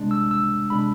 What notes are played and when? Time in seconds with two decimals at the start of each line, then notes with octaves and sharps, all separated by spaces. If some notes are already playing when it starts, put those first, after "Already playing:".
Already playing: C2 C3 G#3 D4
0.11 E6
0.31 E6
0.70 C3 G#3 D4 B5